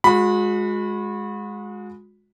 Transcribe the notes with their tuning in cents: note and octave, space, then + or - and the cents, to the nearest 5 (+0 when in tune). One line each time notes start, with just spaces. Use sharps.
G#3 +0 F#4 -40 B5 +0